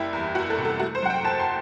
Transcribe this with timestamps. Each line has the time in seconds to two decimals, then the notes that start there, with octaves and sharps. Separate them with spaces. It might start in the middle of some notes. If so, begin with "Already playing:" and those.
Already playing: F#1 G3 E4
0.13 E2
0.35 F#1 F#4
0.50 A4
0.58 C3
0.65 A4
0.79 A3 F#4
0.95 C5
1.02 F#2 F#5
1.10 G5
1.24 F#1 A5
1.40 C6